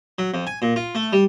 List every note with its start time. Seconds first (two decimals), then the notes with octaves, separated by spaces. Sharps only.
0.19 F#3
0.34 F2
0.47 G#5
0.62 A#2
0.76 F4
0.95 A3
1.13 G3